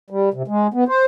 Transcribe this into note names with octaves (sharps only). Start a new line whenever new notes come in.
G3
C3
G#3
B3
C5